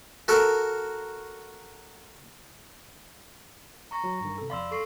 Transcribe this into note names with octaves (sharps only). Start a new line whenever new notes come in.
F#4 A4 A#4
A#5 C#6 A#6
F#3
G2 D#3
C3 A4
F2 D5 F5 B5 C6 E6
A4 C#6 C7